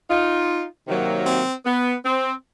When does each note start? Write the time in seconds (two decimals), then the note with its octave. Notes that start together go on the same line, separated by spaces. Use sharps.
0.09 D#4 F4
0.87 C3 D#3 F#3 A#3
1.26 C4
1.65 B3
2.04 C4